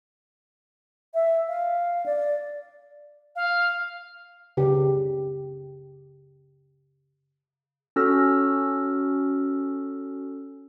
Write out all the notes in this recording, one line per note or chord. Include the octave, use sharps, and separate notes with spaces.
E5
F5
D5
F5
C#3 G4
C#4 F#4 A4 E6 F6 A#6